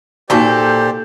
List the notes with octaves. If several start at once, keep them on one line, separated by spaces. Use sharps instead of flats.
A#2 A#3 D#4 F#4 G4 A4 C5 D5